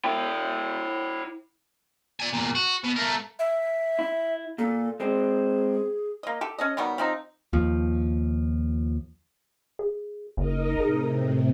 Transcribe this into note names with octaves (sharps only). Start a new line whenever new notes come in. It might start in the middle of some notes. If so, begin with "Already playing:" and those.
E4 G5
D5 G#5
E2 A#2
F#4
B2
A3 A#4
E5
E4
A#2 A4
G#3 C4 G#4
A#3 D#5
G4 A4
C#4 A4 D#5
D#3 F#3 G3 B3
F3 C4 D#4
D#2 F3
G#4
F#1 D#4 A#4 D#5
A2 C3 G#4